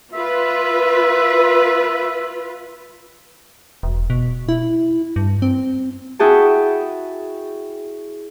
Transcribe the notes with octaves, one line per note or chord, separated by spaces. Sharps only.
F4 B4 E5
E1
B2
E4
G2
C4
E4 F#4 G#4 E5 G5 A5